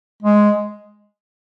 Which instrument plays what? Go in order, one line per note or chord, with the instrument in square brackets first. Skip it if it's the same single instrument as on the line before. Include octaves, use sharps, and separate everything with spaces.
[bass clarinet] G#3